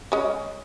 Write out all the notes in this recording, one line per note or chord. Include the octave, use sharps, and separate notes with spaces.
G#3 C#4